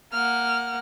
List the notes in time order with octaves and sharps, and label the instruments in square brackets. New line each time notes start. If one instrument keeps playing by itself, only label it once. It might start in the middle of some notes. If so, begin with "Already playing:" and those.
[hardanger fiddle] A#3 F#5 [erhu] F6